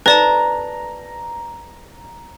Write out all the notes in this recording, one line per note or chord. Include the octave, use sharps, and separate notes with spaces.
B4 D5 A5 A#5